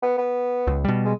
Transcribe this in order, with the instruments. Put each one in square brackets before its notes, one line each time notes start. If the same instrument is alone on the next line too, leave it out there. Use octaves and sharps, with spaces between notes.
[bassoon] B3
B3
[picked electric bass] C#2
B2 G3
[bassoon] G#3